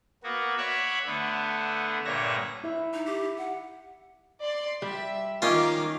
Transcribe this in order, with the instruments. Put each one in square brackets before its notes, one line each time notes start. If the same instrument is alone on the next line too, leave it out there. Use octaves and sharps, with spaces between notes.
[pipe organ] A#3 B3 F#4
C#5 D5 E5 F#5 B5
D3 A3 B3
G2 A#2 D3 C#5 E5 A#6
[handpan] E4 E5
[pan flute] D#4
G4
F#5
[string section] D5 C6
[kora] G3 [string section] E5
[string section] D#3 A#4 D6 [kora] A#3 D#4 [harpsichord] C#4 F4